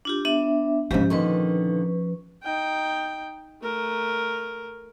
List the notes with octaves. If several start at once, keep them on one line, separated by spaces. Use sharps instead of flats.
D4 F4 G4
B3 D4 E5
G#2 C#3 F3 C#4 G4 E5
A#2 D3 D#3 B4 C#6
D#4 G5
A3 A#4